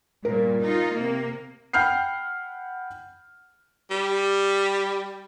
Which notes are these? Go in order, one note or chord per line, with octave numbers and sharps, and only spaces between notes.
G2 A#2 A#4
D#4 F4
C3 A#3
F#5 G5 B5 F6 G6 C7
G3